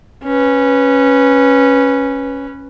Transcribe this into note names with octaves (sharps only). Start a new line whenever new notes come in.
C#4 B4